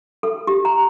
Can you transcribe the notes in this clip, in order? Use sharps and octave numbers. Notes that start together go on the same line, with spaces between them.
A4
G4
A#5